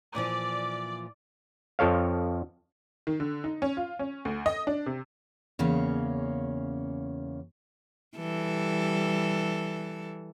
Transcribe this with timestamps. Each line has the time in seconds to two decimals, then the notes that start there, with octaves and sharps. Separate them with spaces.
0.15 A#2 E3 F3 D5
1.79 F2 F3 A4 C#5 F5
3.07 D#3
3.20 D3
3.44 D#4
3.62 C#4
3.77 F4
3.99 C#4
4.25 D2
4.46 D#5
4.67 D4
4.86 C3
5.59 E2 C#3 A#3 C#4
8.18 E3 G3 A4